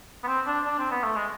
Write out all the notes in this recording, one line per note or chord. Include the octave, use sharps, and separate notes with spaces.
B3
C4
D4
D4
C4
B3
A3
G#3